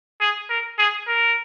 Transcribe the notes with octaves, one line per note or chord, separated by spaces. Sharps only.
G#4
A#4
G#4
A#4